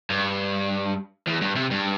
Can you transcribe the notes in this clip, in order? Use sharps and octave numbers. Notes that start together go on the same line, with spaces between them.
G2
E2
G2
C3
G2